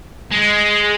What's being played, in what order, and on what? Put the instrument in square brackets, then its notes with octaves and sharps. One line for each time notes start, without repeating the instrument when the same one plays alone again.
[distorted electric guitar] G#3